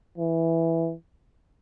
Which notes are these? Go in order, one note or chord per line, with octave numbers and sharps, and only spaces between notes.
E3